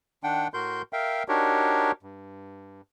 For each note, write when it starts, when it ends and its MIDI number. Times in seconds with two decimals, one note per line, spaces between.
0.24 0.48 51
0.24 0.48 62
0.24 0.48 78
0.24 0.48 79
0.54 0.82 45
0.54 0.82 66
0.54 0.82 70
0.54 0.82 84
0.54 0.82 91
0.93 1.23 70
0.93 1.23 76
0.93 1.23 77
0.93 1.23 79
1.28 1.92 62
1.28 1.92 63
1.28 1.92 66
1.28 1.92 67
1.28 1.92 70
1.28 1.92 73
2.03 2.81 43